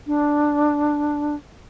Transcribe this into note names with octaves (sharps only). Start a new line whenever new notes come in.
D4